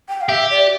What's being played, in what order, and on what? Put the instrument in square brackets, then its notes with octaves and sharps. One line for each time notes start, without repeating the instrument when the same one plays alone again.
[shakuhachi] G5
F5
[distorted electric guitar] G4 [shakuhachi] E5
[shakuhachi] D5